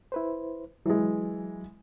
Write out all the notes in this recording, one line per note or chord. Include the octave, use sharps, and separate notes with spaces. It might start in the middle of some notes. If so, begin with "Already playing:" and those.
E4 B4 C5
E3 F#3 G#3